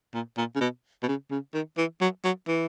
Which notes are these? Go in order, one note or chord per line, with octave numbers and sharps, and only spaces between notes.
A#2
A#2
C#3
B2
B2
C#3
C#3
D#3
E3
F#3
F#3
E3